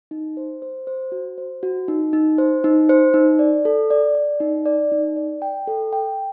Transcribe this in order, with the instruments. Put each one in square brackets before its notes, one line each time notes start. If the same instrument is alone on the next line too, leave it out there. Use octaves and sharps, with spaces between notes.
[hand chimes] D#4
C5
C5
C5
F#4
C5
F#4
D#4
D#4
C5
D#4
C5
D#4
D5
A4
D5
D5
D#4
D5
D#4
D5
G5
A4
G5